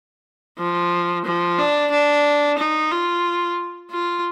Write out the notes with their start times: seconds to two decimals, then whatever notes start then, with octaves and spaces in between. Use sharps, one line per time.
0.58 F3
1.25 F3
1.58 D4
1.92 D4
2.58 D#4
2.91 F4
3.91 F4